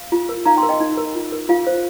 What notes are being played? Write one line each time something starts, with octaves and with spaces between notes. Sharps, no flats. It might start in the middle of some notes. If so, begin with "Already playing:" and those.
Already playing: F5
F4
A#4
D#4 F5 A#5
G5 C6
A#4
D#5 G5
D#4
A#4
F4
A#4
F4 F5
C5